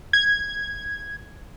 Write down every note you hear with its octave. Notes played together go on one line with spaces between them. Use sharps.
G#6